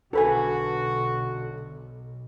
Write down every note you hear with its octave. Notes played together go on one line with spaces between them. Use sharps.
B1 D3 F#4 A4 B4 G#5